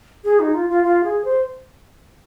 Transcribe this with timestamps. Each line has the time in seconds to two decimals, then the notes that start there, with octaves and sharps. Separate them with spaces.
0.24 G#4
0.40 D#4
0.54 F4
0.69 F4
0.84 F4
1.04 G#4
1.25 C5